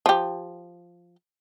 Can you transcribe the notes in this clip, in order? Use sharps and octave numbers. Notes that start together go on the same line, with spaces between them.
F3 G4